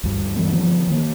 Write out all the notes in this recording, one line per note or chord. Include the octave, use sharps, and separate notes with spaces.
D2 G2
E3 G3 B3 C#4
D3 F3 B3
D#3 A#3